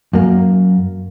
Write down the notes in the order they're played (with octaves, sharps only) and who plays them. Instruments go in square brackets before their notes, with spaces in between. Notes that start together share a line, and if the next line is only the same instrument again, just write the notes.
[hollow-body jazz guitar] F#2 A#3